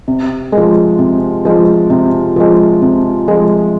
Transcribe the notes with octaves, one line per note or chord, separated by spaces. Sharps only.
C3
G#3
F3
C3
F3 G#3
C3
F3 G#3
C3
F3 G#3